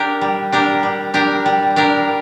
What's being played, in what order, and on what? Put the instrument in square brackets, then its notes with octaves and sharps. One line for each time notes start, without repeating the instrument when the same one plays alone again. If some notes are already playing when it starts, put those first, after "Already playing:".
Already playing: [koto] D4 G4 A#4
G3
D4 G4 A#4
G3
D4 G4 A#4
G3
D4 G4 A#4